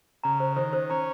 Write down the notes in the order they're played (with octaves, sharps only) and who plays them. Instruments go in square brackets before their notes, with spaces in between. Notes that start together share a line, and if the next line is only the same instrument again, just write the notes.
[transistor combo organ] C#3 [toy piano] A#5
[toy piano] C5
[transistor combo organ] D#3 [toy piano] C5
[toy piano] C5
[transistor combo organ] C#4 [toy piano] A#5